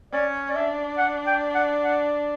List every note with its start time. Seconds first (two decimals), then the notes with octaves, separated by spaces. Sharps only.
0.13 C#4 D5
0.49 D5
0.55 D4 E5
0.98 F#5
1.27 G5
1.54 F#5
1.83 F#5